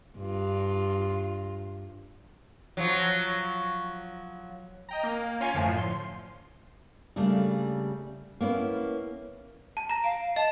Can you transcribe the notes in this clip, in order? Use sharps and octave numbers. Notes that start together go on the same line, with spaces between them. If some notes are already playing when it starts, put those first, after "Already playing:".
G2 F4
F3 F#3
D#5 G5 A#5
A#3
C#4 F4 C#5 F5 G#5
F#2 A2 D3 F3
C6
C#3 G3 A3 A#3 D4
A#3 B3 C#4 E4
A5
A#5 A#6
F5 D7
D#5 A5